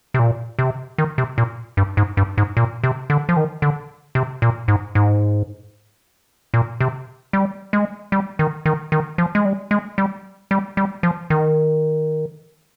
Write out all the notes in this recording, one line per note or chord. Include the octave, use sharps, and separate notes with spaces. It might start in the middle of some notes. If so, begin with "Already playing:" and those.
C3
A#2
C3
D#3
C3
A#2
G2
G#2
G2
G#2
A#2
C3
D3
F3
D#3
D3
C3
A#2
G#2
G#2
A#2
C3
G3
G#3
G3
D#3
D#3
D#3
F3
G#3
G3
G#3
G3
G3
G3
F3
D#3